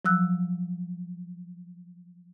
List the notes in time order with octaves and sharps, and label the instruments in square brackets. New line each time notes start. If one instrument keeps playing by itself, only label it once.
[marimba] F3 F#3 E6 F#6